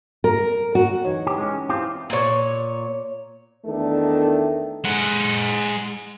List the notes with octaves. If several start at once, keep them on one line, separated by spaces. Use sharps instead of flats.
A#4
F#4
E3 D#4 C#5
G4
G#3 C#4
C4 E4 F4 G4
A#2 C#5
E2 D#3 A3 D4 A4
G#3 F#5